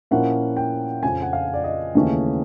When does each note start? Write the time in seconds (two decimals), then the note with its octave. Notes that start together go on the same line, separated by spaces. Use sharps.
0.11 A#2 F3 A#3 C#4 E4 F#5
0.57 G5
1.02 F2 C#3 F3 G#5
1.22 F#5
1.33 F5
1.54 D5
1.64 D#5
1.95 D#2 C#3 E3 A3 C#4